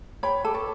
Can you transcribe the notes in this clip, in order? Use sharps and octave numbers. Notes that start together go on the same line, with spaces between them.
C#5 G5 B5
A4 D6
A5 C#6